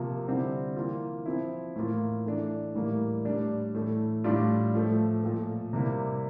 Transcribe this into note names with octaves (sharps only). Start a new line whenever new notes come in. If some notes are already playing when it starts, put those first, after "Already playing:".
Already playing: C3 F3 A#3 F4
D3 G3 C4 E4
E3 A#3 F4
F3 C4 E4
A2 E3 A#3 F4
E3 A3 D4
A2 E3 G3 A#3
A2 G3 D4
A2 E3 A3
A2 E3 G3 D4 F4
A2 F3 A3
A#2 F3 A3
C3 G3 A#3 E4